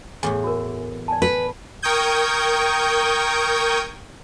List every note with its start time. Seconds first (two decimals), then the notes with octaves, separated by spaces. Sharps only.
0.23 E2 A2 E3 G#5
0.44 F#4 A#4
1.08 D5 G#5 A5
1.22 B4
1.82 A#4 G5 C#6 D#6 G6 G#6